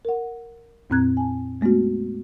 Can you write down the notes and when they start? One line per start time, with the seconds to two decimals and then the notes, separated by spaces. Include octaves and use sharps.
0.05 A#4 F#5
0.90 F2 A#2 C4 A#5 F#6 G#6
1.17 G#5 A5
1.61 G#3 A3 B3 D4 F#4